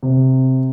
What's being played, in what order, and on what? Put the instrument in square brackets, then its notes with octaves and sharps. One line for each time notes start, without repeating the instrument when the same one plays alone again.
[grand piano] C3